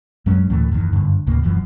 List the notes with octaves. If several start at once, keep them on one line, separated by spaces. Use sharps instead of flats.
F#2 F#3 G#3 C#4
D2 A2 E3 A3
F#1 E2 B2 D#3
F#1 G2 D3
D2 A2 C#3 A#3
E1 F#2 E3 F3